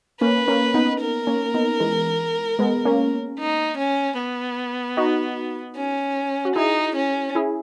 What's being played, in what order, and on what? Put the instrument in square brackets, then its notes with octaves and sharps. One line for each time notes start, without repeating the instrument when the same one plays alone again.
[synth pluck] A#3 C#4 [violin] B4
[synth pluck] A#3 C#4
B3 D#4
[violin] A#4
[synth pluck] A#3 C#4
B3 D#4
E3 G#3
G#3 B3
A#3 C#4
[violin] D#4
C#4
B3
[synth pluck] D#4 F#4
[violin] C#4
[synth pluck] F#4
[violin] D#4 [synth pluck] E4 G#4
[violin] C#4
[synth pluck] E4 G#4